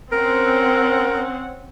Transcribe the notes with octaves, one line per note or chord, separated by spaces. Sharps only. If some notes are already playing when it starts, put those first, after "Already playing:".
C4 C#4 A#4 F#5